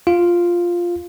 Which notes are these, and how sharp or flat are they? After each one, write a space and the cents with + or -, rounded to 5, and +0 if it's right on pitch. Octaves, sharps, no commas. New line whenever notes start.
F4 +0 F5 +0